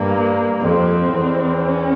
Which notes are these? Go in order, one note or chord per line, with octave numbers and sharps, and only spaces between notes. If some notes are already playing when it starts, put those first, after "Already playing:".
Already playing: G2 A#3
F2 C4
E2
C#4